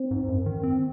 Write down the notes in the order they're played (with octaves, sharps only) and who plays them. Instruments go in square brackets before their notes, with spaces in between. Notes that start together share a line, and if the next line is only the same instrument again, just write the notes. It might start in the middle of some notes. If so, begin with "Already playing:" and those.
Already playing: [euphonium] C4
[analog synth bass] G#2
F#2
D#3
C4